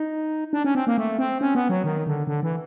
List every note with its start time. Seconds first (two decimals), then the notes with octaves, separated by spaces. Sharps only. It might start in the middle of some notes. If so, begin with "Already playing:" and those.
Already playing: D#4
0.53 D4
0.64 C#4
0.75 C4
0.87 A#3
0.98 A3
1.19 C4
1.41 C#4
1.55 B3
1.69 F#3
1.84 D#3
2.07 D3
2.27 D3
2.43 E3